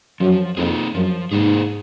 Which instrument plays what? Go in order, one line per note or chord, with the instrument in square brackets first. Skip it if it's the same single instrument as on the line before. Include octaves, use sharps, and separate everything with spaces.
[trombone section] F#2 [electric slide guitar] F3
[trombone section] F2 [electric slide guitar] A#3 D#4 G#4
[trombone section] F#2 [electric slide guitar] F3
[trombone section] G#2 [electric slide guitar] A#3 D#4 G#4